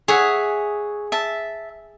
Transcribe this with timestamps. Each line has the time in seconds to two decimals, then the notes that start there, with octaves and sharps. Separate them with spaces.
0.08 G#4 C#5 E5 F#5
1.12 E5 A5